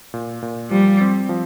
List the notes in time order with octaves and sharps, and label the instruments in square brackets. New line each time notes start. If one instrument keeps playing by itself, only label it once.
[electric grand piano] A#2
A#2
[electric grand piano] F3 [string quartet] G3
[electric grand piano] C4
F3